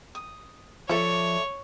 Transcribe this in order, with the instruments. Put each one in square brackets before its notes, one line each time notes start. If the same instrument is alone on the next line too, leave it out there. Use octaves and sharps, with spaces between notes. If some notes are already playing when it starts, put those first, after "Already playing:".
[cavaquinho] D#6
[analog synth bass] F3 [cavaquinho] A4 D5 E5 [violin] C#5